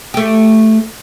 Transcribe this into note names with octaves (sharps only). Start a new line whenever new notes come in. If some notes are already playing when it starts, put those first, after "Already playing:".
A3 G4